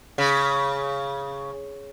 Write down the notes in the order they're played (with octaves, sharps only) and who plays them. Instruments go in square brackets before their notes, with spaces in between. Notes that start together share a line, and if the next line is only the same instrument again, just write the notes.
[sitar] C#3